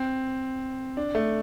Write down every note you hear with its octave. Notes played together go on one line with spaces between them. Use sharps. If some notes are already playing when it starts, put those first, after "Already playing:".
Already playing: C4
D4
A3